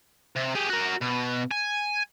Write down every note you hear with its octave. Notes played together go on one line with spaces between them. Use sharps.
C3
G4 G#4
F#4 A#4
B2
G#5